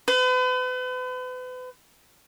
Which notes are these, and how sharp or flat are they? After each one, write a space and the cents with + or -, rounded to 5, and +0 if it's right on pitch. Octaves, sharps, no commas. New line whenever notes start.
B4 +40